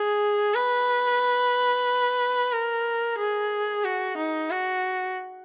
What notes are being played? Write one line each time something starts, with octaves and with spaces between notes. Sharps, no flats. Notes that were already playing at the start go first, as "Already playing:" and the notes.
Already playing: G#4
B4
A#4
G#4
F#4
D#4
F#4